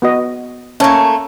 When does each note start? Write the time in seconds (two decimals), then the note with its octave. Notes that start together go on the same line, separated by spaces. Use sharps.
0.02 B3 F#4 D#5
0.80 A3 A#3 C#4 C#5